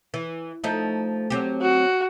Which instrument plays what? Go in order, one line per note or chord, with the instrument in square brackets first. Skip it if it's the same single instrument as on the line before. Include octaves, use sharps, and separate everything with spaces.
[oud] E3
F3 A3 D#4
F#3 C4 G4
[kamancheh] F#4